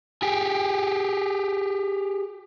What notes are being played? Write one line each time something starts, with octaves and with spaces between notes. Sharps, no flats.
G4 G#4